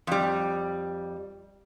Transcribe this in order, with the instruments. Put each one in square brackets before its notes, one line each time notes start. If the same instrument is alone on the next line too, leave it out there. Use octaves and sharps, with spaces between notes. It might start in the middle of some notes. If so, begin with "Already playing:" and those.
[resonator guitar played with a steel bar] F2 G3